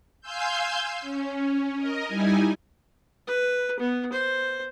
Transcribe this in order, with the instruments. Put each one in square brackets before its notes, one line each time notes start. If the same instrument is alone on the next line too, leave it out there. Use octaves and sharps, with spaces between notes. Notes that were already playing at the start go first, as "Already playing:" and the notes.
[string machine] F5 G#5 C6 E6 G6
C#4
A#4 D#5
G3 D#4 E4 G#5
[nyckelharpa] B4
B3
C5